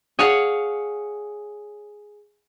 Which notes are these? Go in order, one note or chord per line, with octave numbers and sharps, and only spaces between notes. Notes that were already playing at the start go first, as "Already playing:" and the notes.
G#4 C#5 F5 F#5